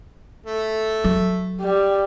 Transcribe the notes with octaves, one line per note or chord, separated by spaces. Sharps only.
A3
F#3
G3